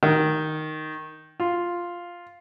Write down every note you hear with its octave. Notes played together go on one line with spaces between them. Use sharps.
D#3
F4